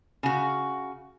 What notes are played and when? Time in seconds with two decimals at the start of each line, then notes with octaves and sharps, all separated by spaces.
0.23 C#3 F#4